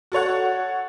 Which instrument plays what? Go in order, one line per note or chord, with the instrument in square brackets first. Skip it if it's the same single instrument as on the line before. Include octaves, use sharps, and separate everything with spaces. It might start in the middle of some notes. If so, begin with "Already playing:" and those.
[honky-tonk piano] F#4 A4 C#5 F#5